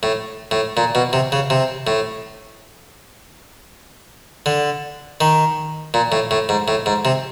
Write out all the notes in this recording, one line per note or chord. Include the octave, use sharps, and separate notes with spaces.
A2
A2
A#2
B2
C3
C#3
C3
A2
D3
D#3
A#2
A2
A2
G#2
A2
G#2
C3